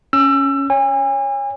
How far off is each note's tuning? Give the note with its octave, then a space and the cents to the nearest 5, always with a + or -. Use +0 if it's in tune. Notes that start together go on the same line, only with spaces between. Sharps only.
C#4 +0 E6 +25
C#5 +0 G#5 -35